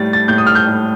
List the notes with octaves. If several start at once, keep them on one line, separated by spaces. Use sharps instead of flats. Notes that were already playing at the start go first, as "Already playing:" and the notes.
Already playing: A2 G3 A6
A6
A2 G6
D#6
F6
G6
A2